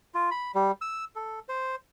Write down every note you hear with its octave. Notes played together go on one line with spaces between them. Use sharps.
F4
B5
G3
E6
A4
C5